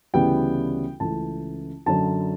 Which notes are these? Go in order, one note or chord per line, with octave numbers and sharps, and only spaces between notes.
D2 C#3 E3 G3 B3 G5
C#2 C#3 E3 A3 A5
F#2 D3 F#3 A5